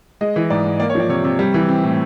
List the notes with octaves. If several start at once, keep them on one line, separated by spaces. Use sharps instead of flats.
G#3 D#5
E3
G#2 D5
G#2
A#3 D5
C#5
F3 D5
C3 C#5
C3
G3
E3
C4
A2